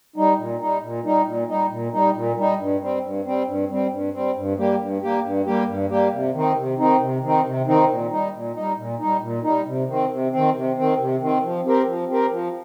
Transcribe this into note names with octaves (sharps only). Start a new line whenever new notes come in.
G3 D#4
A#2
G3 D#4
A#2
G3 D#4
A#2
G3 D#4
A#2
G3 D#4
A#2
G3 D#4
G2
G3 C4
G2
G3 C4
G2
G3 C4
G2
G3 C4
G2
G3 A#3 G4
G2
G3 A#3 G4
G2
G3 A#3 G4
G2
G3 A#3 G4
C3
D#3 C4 D#4
C3
D#3 C4 D#4
C3
D#3 C4 D#4
C3
D#3 C4 D#4
A#2
G3 D#4
A#2
G3 D#4
A#2
G3 D#4
A#2
G3 D#4
C3
D#3 C4
C3
D#3 C4
C3
D#3 C4
C3
D#3 C4
F3
C4 G4 A#4
F3
C4 G4 A#4
F3